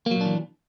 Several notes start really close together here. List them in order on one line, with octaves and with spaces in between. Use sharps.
A#3 F#3 A#2 D4 E3